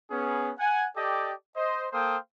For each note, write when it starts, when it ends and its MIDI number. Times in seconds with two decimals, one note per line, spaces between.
0.11 0.52 59
0.11 0.52 61
0.11 0.52 68
0.59 0.87 78
0.59 0.87 80
0.97 1.33 67
0.97 1.33 69
0.97 1.33 74
0.97 1.33 75
0.97 1.33 79
1.56 1.87 72
1.56 1.87 75
1.92 2.17 58
1.92 2.17 69
1.92 2.17 72
1.92 2.17 77
1.92 2.17 79
1.92 2.17 87